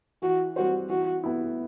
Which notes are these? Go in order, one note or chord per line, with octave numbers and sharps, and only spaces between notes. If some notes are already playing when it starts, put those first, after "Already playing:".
E3 F#4
G3 C4 F#4 G4 C5
E3 F#4
B3 E4